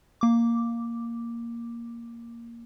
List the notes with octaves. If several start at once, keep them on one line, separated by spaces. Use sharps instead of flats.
A#3 D6